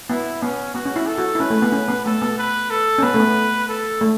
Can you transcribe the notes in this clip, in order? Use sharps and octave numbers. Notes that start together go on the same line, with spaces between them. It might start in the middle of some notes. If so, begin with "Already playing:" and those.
B3 E4
B3 C#4
B3 F#4
C#4
E4
A4
F#4
E4
C#4 B4
A3
B3
C#4
B3
A3 A4
B3
B4
A4
C#4
B3 B4
A3
B3
A4
A3